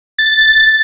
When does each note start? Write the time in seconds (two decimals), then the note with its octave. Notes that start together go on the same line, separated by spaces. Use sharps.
0.18 A6